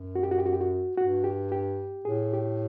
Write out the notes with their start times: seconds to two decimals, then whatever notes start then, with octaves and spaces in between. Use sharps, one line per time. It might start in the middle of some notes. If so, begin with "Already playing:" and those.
Already playing: F#2
0.15 F#4
0.23 G4
0.31 F#4
0.38 G4
0.46 F#4
0.53 G4
0.61 F#4
0.97 G2 F#4
1.24 G4
1.52 G4
2.05 A2 G#4
2.33 G4